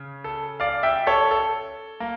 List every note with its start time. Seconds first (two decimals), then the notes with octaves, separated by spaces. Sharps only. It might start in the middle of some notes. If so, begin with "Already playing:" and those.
Already playing: C#3
0.24 A4
0.60 D5 F5
0.83 E5 G5
1.07 A4 C#5
1.31 A4
2.00 A#3